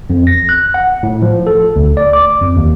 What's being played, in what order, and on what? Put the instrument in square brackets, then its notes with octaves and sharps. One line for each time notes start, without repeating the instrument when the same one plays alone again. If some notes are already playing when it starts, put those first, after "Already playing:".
[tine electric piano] F2
A#6
F#6
F#5
A2
F3
A4
D2
D5
D6
F2
D#2